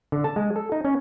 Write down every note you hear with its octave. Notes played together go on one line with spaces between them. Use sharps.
D3
A5
G#3
A4
D#4
C#4